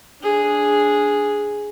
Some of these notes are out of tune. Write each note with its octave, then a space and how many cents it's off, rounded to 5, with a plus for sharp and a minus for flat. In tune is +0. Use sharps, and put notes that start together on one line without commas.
D4 -5 G#4 +0